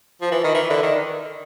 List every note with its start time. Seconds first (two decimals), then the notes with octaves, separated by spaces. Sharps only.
0.21 F3
0.32 E3
0.44 D#3
0.55 E3
0.70 D3
0.83 D#3